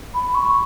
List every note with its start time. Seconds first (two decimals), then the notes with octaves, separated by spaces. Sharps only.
0.14 B5
0.35 C#6